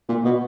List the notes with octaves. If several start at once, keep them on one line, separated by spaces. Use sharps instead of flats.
A#2
B2